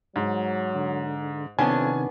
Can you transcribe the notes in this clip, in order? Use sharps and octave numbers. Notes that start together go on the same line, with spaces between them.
G#2 F#3
D3
F2 C3 D#3 B3 C#4 D4 G#5